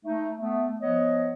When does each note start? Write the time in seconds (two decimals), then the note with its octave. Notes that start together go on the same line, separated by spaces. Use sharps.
0.05 A3 D#4
0.38 A3 B3
0.80 F3 B3 C#5 D#5